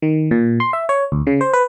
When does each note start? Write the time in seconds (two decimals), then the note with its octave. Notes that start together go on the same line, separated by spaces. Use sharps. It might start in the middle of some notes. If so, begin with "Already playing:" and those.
0.02 D#3
0.31 A#2
0.60 C6
0.73 E5
0.89 C#5
1.12 D2
1.27 C#3
1.41 C5
1.53 B4